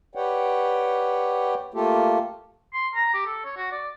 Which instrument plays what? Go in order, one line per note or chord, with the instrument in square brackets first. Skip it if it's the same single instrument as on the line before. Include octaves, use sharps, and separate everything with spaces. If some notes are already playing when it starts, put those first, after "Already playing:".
[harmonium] G4 B4 C#5 D5 F#5 G5
A3 A#3 F4 G4 A4
[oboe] C6
A#5
G4
A4
C#5
F#4
D5